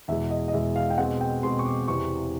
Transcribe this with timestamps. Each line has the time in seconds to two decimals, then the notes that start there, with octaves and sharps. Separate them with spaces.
0.08 E2 B2 G#3 E5
0.31 D#5
0.48 D#5
0.53 E2 B2 G#3 E5
0.76 F5
0.90 G5
0.98 B2 G#3 C4 F#5
1.21 G5
1.43 B2 G#3 C4 C6
1.59 C#6
1.66 D6
1.88 E2 C3 E3 C#6